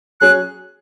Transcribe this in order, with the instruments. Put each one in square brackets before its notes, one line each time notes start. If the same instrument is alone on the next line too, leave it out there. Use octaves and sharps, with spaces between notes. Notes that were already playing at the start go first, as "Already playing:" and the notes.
[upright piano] F#3 C#4 G#4 C#5 [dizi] F#6